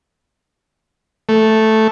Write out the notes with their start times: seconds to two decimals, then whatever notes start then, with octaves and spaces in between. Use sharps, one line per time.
1.29 A3